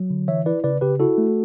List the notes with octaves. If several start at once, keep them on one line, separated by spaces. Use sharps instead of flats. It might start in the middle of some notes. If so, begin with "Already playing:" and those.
Already playing: F#3
D3
E3 C#5 E5
E4 B4 D5
C#3 B4 D5
C#3 G4 B4
E4 F#4 A4
A3